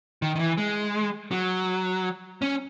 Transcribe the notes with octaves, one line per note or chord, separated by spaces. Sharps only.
D#3
D#3
E3
G#3
F#3
C#4